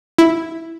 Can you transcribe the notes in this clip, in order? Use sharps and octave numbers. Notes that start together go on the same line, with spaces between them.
E4